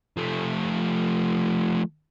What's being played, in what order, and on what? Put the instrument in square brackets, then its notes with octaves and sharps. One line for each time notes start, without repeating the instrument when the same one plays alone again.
[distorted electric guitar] F3 A3